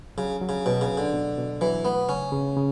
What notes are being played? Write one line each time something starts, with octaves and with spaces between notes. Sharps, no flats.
C#3 F#3
F#3
C#3
B2 F#3
C#3
B2
D3
B2
B2
E3 F#3
A3 B3
C#3 C#4
C#3
C#3